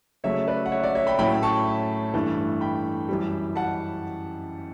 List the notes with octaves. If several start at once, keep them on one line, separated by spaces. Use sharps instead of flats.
C#3 F#3 A3 C#5 E5
B4 D5
F#5
C#5 E5
D5 F#5
C#5 E5
G5 B5
A2 F#3 A3 C#4 E4 G5 B5
A5 C#6
G2 E3 A3
G5 B5
F#2 E3 G3
F#5 A5